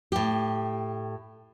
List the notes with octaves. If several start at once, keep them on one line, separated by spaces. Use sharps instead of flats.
A2 G4